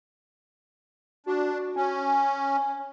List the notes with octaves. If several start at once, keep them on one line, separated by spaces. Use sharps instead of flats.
D4 F#4
C#4 G#5